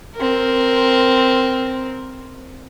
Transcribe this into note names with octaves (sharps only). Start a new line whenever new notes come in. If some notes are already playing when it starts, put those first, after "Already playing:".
C4 A#4